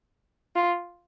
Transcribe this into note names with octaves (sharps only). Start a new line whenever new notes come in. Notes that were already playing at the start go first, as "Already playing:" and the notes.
F4